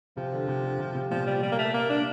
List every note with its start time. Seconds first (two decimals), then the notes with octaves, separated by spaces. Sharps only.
0.17 C3 F3
0.32 D3
0.48 C3
0.63 D3
0.79 C3
0.95 C3
1.11 A#2 F3
1.26 G3
1.43 G3
1.52 A#3
1.59 A3
1.74 A#3
1.90 D4